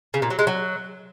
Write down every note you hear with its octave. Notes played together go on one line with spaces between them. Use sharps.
C#3
A#2
F#3
G#3
F#3